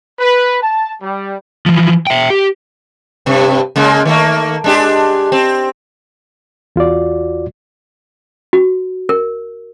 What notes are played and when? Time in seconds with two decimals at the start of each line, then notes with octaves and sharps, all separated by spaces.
0.19 B4
0.62 A5
1.02 G3
1.66 E3 F3
2.07 E5 G5
2.30 G4
3.26 G2 C3
3.76 C#3 G#3 A#3
4.05 D#3 A3 A#3
4.64 G#3 D4 G4
5.32 C4
6.76 E2 F4 F#4 D5
8.53 F#4
9.09 A#4